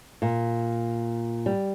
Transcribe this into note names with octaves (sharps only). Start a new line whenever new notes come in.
A#2
G3